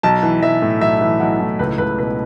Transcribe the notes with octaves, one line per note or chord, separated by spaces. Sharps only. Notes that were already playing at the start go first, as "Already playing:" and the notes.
B1 A5
E3
B1 E5
A2
B1 E5
E3
B1 F#5
A2
C#2 B4
C#2 B4
B2 B4